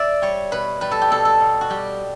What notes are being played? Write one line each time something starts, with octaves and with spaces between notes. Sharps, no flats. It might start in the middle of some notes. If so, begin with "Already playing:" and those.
Already playing: D5 E5
G3 C#5
B2 B4
G3 B4
A4
G4
B2 A4
A4
B2
F#4
G3 G4